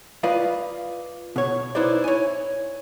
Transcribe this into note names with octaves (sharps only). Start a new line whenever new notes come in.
F4 B4 D5 D#5 F5
B2 C#5
D#4 E4 B4 C5 D5
C#5 G#5